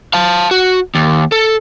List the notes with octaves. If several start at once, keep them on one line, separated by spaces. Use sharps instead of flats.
F5 A5
F#4
D#2
A4